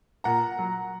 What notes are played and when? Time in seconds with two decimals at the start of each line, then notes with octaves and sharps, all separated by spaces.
0.24 A#2 F#5 A#5
0.59 F#3